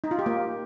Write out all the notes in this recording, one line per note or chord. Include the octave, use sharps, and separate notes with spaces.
D#4
F4
G4
A#3